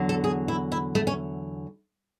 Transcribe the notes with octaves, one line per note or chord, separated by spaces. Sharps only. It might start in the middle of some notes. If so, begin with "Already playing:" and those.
Already playing: E2 D3 F#3
A4
G#4
E4
E4
A3
C#4